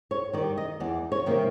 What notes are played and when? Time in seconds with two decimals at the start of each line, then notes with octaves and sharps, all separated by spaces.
0.11 C#5
0.33 D#3 D5
0.37 G3
0.57 D#5
0.80 E2 D5
1.12 C#5
1.26 C3 D#3 G3 A#3